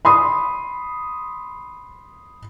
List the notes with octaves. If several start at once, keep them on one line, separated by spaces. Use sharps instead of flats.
B5 C6 D#6